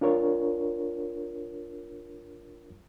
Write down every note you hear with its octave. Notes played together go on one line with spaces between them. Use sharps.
D4 F4 A#4 C#5